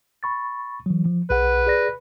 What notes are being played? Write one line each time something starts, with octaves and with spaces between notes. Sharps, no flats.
B5 C#6 A6
E3 F#3
F3
B1 G#4 B4 F#5
G#4 D5 A#6